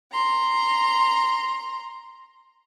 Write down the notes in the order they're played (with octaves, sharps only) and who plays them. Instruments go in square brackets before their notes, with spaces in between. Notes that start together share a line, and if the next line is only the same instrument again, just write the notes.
[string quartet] A#5 C6